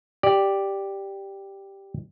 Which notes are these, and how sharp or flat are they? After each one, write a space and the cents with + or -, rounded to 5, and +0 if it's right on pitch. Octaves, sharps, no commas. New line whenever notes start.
G4 +0 D5 +0